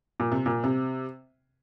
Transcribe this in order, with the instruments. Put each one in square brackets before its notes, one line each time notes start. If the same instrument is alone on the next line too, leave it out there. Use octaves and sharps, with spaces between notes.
[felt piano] A#2
C3
A#2
C3